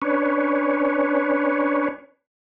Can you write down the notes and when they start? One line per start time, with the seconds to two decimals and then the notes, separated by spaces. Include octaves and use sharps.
0.02 C#4 D4 B4 C#5